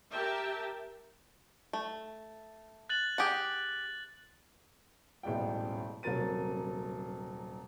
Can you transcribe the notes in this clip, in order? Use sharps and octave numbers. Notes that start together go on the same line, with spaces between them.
G4 A#4 E5 G5 A5
A3
F#6 A6 F#7
G4 G#4 F#5
D#1 A1 B2 G#3 D5 G5
D#1 C3 F#3 A#4 A6 D#7